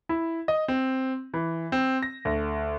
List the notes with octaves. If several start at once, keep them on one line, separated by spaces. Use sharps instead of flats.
E4
D#5
C4
E3
C4
A#6
D2